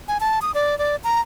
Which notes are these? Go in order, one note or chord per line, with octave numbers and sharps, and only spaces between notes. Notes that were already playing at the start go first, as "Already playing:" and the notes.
G#5
A5
D#6
D5
D5
A#5